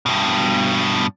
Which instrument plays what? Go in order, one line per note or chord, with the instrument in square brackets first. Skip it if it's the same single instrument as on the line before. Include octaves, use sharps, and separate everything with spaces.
[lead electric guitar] G2 B2